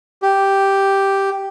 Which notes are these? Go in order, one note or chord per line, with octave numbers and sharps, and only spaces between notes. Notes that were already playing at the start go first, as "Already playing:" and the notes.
G4